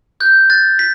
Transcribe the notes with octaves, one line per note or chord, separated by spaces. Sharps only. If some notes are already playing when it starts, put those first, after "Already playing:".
F#6 G6
F#6 A6
B6